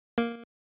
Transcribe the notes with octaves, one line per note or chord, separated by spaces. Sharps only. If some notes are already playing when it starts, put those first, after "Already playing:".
A#3